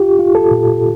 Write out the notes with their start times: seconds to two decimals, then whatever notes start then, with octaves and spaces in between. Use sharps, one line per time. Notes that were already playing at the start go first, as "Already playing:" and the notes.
Already playing: F4 G4
0.19 F4
0.35 A4
0.51 A#2